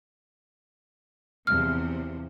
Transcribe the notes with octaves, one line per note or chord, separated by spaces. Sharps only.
E2 C3 F3 F6